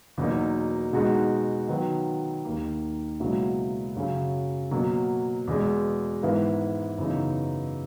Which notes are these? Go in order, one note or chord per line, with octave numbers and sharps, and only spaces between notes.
E2 B2 F#3 A#3 D#4
B2 G#3 D#4 F#4
D#3 F#3 B3
D#2 D#3 A#3
C#2 B2 F#3 A#3 E4
F#2 C#3 F#3 C#4
B2 F#3 A#3
E2 B2 G#3
G#2 E3 B3 E4 A#4
F#2 C#3 E3 B3 D#4